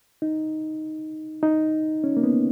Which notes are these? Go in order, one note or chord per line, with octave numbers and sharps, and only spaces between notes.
D#4
D#4
C#4
A#3
B3